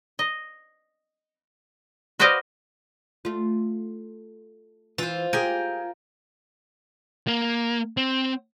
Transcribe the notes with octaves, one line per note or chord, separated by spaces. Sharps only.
D#5
F#4 B4 C5 D5 D#5 F5
A3 F4
E3 F4 C5
F4 G4 G#4 A#4 G5 G#5
A#3
C4